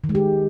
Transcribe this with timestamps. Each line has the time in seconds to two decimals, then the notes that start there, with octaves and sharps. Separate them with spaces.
0.04 D#3
0.09 G#3
0.15 G4